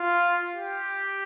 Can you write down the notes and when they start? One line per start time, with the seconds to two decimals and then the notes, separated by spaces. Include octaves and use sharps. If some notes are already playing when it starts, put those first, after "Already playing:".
Already playing: F4
0.55 G4